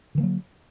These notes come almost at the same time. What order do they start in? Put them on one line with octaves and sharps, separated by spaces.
D3 E3 A#3 F#3